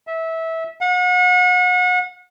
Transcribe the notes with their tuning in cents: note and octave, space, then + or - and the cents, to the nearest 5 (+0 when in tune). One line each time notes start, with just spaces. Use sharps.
E5 -20
F#5 -35